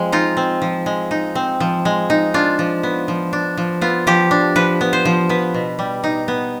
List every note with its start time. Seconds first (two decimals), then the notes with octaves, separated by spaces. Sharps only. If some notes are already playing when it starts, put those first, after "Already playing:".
Already playing: F3 G#3 C4
0.12 D#4 F4
0.37 C4
0.62 F3
0.86 G#3
1.11 D#4
1.35 C4
1.60 F3
1.85 G#3
2.10 D#4
2.34 D4 F4
2.59 F3
2.83 B3
3.08 F3
3.33 D4
3.57 F3
3.81 B3 F4
4.07 F3 G4
4.31 D4
4.56 F3 B4
4.81 B3
4.93 C5
5.05 F3
5.29 B3 B4
5.54 B2
5.79 G3
6.04 D#4
6.28 B3